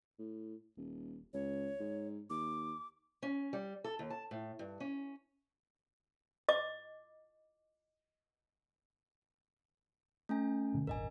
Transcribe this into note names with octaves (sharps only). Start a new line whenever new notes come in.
A2
D#1
C#2 C#5
G#2
D#2 D6
C#4
G3
A4
D#2
A5
A2
G2
C#4
D#5 D6
A3 C#4 G#5
B2 D3 F3
D#1 G#1 D4 A#4 D#5 G#5